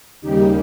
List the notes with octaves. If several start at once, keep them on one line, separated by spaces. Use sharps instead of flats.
D#2 C#3 G3 A#3 D#4 G4